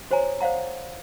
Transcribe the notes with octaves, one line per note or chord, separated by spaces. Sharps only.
F#4 C5 C#5 G#5 A#5
C5 D5 F5 F#5 A#5